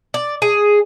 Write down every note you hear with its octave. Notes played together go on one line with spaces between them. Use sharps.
D5
G#4